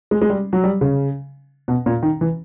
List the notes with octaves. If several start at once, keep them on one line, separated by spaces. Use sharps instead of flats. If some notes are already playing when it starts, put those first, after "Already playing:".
G#3
G#3
G3
F#3
G3
C#3
B2
A#2
D#3
E3